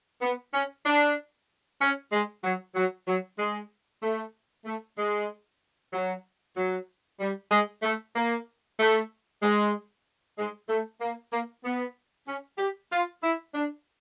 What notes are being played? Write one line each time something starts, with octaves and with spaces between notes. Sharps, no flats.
B3
C#4
D4
C#4
G#3
F#3
F#3
F#3
G#3
A3
A3
G#3
F#3
F#3
G3
G#3
A3
A#3
A3
G#3
G#3
A3
A#3
A#3
B3
C#4
G4
F4
E4
D4